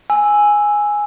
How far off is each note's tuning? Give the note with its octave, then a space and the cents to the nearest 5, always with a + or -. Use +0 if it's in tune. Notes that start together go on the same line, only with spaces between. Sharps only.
G#5 +0 E6 +0